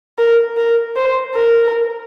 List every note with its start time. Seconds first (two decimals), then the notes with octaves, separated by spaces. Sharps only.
0.18 A#4
0.57 A#4
0.96 C5
1.35 A#4